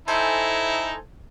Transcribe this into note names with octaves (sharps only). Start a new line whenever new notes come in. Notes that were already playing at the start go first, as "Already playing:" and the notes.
D#4 E4 A4 C5 G#5